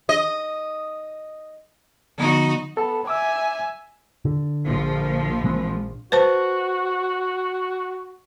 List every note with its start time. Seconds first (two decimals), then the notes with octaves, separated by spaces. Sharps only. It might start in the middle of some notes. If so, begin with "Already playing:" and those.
0.09 D#5
2.18 D3 F3 B3 D#4 F#4
2.77 B3 A4 A5
3.07 E5 G#5 D6 E6
4.25 D3
4.66 A#1 F3
5.44 E3 G#3 C4
6.12 F#4 B4 C5 A5